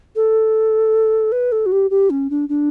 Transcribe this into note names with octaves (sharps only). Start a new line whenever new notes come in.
A4
B4
A4
F#4
G4
G4
C#4
D4
D4